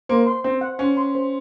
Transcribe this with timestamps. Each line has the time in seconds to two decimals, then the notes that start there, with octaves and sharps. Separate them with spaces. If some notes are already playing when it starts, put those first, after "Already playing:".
0.09 A#3 C5
0.27 C6
0.44 C4 C5
0.61 F#5
0.79 C#4 C5
0.97 C6
1.15 C5